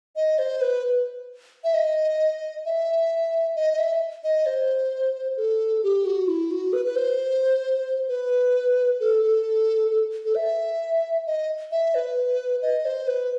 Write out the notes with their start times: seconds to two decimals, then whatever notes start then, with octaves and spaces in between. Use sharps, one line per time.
0.16 D#5
0.39 C5
0.61 B4
1.64 E5
1.74 D#5
2.65 E5
3.56 D#5
3.74 D#5
3.78 E5
4.24 D#5
4.46 C5
5.37 A4
5.83 G4
6.05 F#4
6.28 E4
6.51 F#4
6.73 B4
6.85 B4
6.96 C5
8.09 B4
9.00 A4
9.22 A4
9.90 A4
10.25 A4
10.36 E5
11.26 D#5
11.72 E5
11.95 B4
12.62 D#5
12.85 C5
13.07 B4